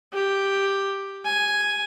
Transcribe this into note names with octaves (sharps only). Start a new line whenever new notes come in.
G4
G#5